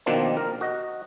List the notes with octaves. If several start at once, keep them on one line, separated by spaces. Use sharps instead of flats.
B2 D#3 F3 A#3 C4 D4
A#4
F#4 D#5